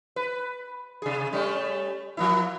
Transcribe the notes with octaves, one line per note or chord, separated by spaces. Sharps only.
B4
C3 G#4
G3 A3 C#4
F3 A#3 E4